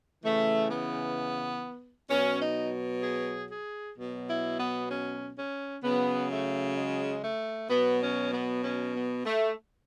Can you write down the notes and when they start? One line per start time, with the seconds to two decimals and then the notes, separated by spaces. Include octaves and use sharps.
0.24 C#3 E3 A3
0.69 B3
2.10 B2 F#3 C#4
2.41 D#4
3.03 G#4
3.50 G#4
3.97 B2 F#3
4.28 E4
4.59 B3
4.90 C#4
5.37 C#4
5.83 C#3 F#3 B3
6.30 A3
6.77 G#3
7.24 A3
7.70 B2 F#3 B3
8.01 C#4
8.33 B3
8.63 C#4
8.95 B3
9.26 A3